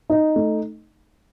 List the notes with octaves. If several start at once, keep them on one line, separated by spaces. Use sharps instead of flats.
D#4
A3